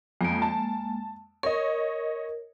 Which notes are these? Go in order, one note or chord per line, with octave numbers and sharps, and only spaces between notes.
F2 G#3 A#3
A5
A#4 C#5 D#5